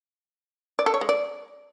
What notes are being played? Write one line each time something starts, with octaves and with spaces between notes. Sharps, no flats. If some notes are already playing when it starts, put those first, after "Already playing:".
D5
A4
C#5
G#3
D5